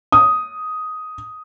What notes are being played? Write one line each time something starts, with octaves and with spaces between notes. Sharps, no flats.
D#6